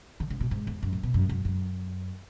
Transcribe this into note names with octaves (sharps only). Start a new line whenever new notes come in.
D3
C#3
B2
G#2
E2
F#2
A2
B2
F#2
F#2
F#2